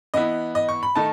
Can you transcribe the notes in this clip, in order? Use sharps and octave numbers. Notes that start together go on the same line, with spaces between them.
E3 B3 E4 D#5
D#5
C#6
B5
D#3 A3 D#4 A5